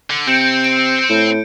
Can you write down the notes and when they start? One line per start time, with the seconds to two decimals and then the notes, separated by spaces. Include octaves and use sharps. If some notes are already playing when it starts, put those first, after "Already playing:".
0.10 D3
0.27 C3 C4 G6 C#7 D7
0.64 D7
1.09 A2